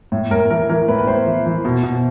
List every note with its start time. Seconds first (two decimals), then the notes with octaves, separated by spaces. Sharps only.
0.12 A2
0.31 A2 A#4
0.50 E3 A#4
0.69 E3 A#4
0.88 A2 B4
0.98 B4
1.07 A2 C5
1.27 E3
1.46 E3
1.65 B2
1.83 B2